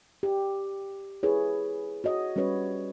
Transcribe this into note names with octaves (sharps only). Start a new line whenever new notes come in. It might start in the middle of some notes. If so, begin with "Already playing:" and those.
G4
E4 G#4 B4 C#5
F#4 C#5 D#5
G3 C#4 F#4 B4 C#5